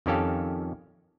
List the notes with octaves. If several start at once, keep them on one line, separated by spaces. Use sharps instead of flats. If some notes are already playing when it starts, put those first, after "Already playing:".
F2 D#3 C#4 G4 A4 F5